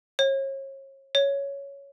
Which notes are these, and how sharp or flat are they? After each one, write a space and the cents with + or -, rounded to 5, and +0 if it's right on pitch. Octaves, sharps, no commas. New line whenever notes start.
C#5 -35
C#5 +5